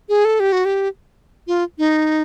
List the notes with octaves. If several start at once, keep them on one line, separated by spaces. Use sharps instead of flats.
G#4
A4
G4
F#4
G4
F4
D#4